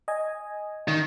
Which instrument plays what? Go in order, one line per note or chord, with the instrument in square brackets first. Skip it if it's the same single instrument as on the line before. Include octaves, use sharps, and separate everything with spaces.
[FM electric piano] D#5 G#5
[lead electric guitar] D#3